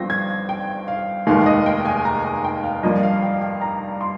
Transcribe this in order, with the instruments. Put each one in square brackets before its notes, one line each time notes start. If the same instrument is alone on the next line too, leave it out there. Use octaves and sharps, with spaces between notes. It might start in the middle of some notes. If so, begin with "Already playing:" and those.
Already playing: [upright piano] G1 G2 F3 C4 A#6
G#6
G5
F5
F1 D#2 D#3 G#3 F5
D#5
G5
G#5
A#5
G#5
G5
F5
G2 F3 A#3 D4 D#5
F5
G5
G5
A#5
C6